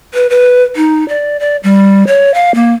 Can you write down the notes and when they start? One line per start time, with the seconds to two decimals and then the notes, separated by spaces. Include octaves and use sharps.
0.14 B4
0.30 B4
0.76 D#4
1.09 D5
1.40 D5
1.64 G3
2.07 C#5
2.34 F5
2.55 A#3